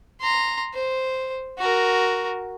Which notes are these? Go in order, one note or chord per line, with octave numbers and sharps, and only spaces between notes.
A#5 C6
C5
F#4 A#4